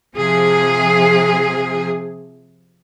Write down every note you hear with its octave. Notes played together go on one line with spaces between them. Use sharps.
C3 F3 G#4